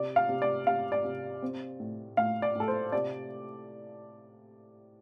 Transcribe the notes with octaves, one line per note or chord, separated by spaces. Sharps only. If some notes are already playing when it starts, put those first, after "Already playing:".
Already playing: C3 D5
F5
C3
D5
C3 F5
D5
C3
C4
A2
A2 F5
D5
A2 A4
C5
C3 D5